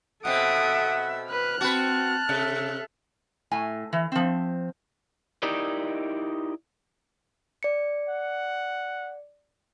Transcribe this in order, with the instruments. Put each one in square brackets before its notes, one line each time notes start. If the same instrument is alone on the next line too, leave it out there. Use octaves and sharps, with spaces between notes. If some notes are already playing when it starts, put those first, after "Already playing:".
[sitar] B2 C4 [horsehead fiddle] A4 E5 [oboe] F#5 [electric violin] D#6 D7
[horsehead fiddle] B4 [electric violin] F6 F#6
[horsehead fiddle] C4 [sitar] F#4 B4 [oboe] A5
[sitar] C3 [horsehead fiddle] A4 E5
[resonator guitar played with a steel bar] A2 G#5
E3
F3 C4
[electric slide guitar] D#4 E4 G4 A#4 D5 D#5
[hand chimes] D5 C#7
[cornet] F#5